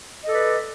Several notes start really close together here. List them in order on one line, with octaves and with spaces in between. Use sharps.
D#5 A4 D5 B4